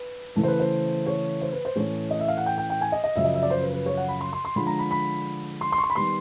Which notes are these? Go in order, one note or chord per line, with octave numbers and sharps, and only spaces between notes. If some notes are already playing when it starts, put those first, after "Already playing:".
Already playing: B4
C#3 E3 A3
C5
B4
C5
C#5
C5
B4
C5
A2 E3 A3 C#4 C#5
D#5
E5
F5
F#5
G5
G5
G5
G#5
D#5
D#5
F#2 C#3 F3 E5
D#5
E5
D5
C5
B4
B4
C#5
F#5
B5
C6
C6
C6
D3 F3 G#3 B5
A#5
B5
B5
C6
C6
C#6
C6
B5
D#3 G3 B3 C6